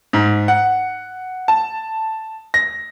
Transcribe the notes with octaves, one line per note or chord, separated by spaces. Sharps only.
G#2
F#5
A5
A#6